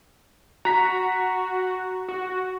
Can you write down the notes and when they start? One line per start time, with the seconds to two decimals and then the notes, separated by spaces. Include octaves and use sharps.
0.65 F#4 A#5 B6
2.09 F#4